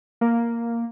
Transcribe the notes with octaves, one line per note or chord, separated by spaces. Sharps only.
A#3